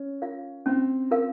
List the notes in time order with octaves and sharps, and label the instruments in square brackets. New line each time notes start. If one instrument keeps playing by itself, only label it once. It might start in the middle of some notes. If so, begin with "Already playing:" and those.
Already playing: [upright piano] C#4
[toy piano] F4 A#4 F5
[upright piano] C4 [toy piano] C#4
[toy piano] F4 A#4 F5